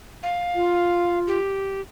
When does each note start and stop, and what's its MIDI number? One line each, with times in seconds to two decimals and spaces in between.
0.23 1.19 77
0.55 1.38 65
1.27 1.81 67